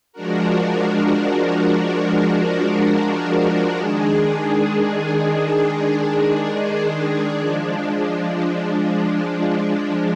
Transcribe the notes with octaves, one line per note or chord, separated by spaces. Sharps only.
F3 G#3 D4 F#4 A#4
D#3 G#3 D4 G#4
F3 G#3 D4